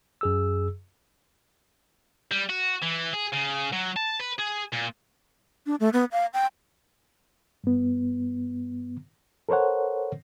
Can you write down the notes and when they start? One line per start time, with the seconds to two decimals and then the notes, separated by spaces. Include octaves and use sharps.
0.21 F#2 G#4 E6
2.32 G3
2.50 F#4
2.83 E3
3.14 G#4
3.33 C#3
3.73 F#3
3.96 A5
4.19 B4
4.38 G#4
4.73 A#2
5.66 D4
5.80 A3
5.93 B3
6.12 F5
6.34 G5
7.64 G2 B3
9.49 A4 A#4 C5 C#5 F#5